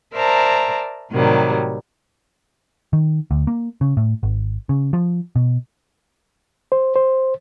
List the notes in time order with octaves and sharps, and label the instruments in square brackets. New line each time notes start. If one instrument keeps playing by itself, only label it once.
[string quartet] A#4 C5 D5 E5 A5 A#5
A2 C3 D#3 F#3 G3
[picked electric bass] D#3
D2
A#3
C#3
A2
G#1
C#3
F3
B2
[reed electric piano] C5
C5